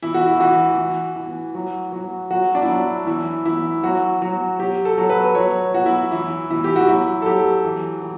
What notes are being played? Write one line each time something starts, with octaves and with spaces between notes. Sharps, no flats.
E3 E4
F#4
E4
E3 F#4
E3
E3
F#3
F#3
F#3 F#4
D4
E4
F#3 F#4
E3 E4
E3 E4
F#3 F#4
F#3
F#3 G4
A4
F#3
B4
F#3 C#5
F#3 F#4
E4
E3 E4
E3 E4
G4
F#4
F#3 E4
A4
F#3 G4
E3
E3